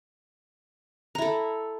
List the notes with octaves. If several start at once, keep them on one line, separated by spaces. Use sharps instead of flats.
E4 A4 A#5